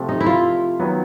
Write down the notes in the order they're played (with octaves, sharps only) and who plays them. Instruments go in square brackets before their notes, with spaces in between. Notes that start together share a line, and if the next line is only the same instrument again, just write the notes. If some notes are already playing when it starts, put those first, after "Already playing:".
Already playing: [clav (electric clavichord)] C3 F3 A3
[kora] D#4
E4
F4
[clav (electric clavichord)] D#3 F#3 B3